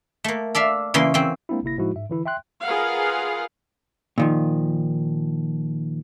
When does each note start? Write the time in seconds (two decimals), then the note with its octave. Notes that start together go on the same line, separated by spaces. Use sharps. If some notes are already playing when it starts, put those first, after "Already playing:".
0.24 A3 A#3
0.55 A4 D5 E5 F5
0.94 C#3 E3 A#3 C6
1.14 E3 C4
1.49 G#3 A#3 C4 D4 E4
1.63 G1 C3 A#3 E4 A#6
1.78 A2 F3 G#3 D#4 E4 F#4
1.95 G#2 E5
2.10 D3 E3 E4
2.26 E5 G5 C6 F#6
2.63 F4 G#4 A#4 B4 F5 F#5
4.18 A#2 D#3 F3